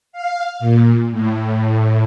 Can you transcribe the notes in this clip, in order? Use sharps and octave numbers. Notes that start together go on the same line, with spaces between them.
F5
A#2
A2